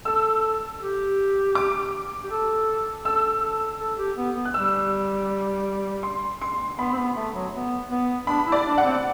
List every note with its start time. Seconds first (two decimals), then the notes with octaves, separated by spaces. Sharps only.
0.05 A4 E6
0.81 G4
1.55 D6
2.24 G4
2.30 A4
3.05 A4 E6
3.41 A4
3.80 A4
3.98 G4
4.17 B3
4.35 B3
4.45 F#6
4.54 G3 E6
6.03 C6
6.42 C6
6.78 B3 B5
6.93 C4
6.97 B3
7.16 A3
7.34 F#3
7.53 B3
7.91 B3
8.27 D4 B5
8.47 E4
8.52 D5
8.65 D4
8.78 F#5
8.84 C4